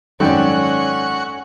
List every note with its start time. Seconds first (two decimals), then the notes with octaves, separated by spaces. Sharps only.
0.20 G#1 F#2 C#4 A4 D5 F#5 G5 C#6